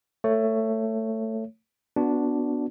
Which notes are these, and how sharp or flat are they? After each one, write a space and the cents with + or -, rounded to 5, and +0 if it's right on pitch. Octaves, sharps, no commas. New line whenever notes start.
A3 +15 C#5 +0
B3 +0 D4 -5 F#4 -15